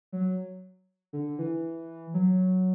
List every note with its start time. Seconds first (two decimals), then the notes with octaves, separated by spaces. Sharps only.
0.13 F#3
1.13 D3
1.39 E3
2.14 F#3